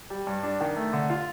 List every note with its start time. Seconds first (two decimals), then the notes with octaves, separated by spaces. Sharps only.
0.10 G3
0.27 G2
0.43 D4
0.60 D#3
0.76 A3
0.93 D3
1.10 F4